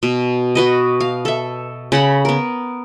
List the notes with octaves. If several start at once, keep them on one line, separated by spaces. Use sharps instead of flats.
B2
F#4 B4 D#5
F5
A4 E5
C#3 F#5 B5
B3 A#4